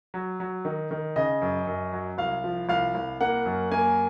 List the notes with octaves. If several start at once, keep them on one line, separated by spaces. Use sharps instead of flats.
F#3
F#3
D#3
D#3
C#3 D#5
F#2
F#2
F#3
C2 F5
F3
C2 F5
C2
A#3 F#5
F#2
A#3 G#5